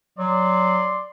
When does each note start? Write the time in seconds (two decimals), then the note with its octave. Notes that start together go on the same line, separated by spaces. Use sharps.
0.19 F#3 D5 C6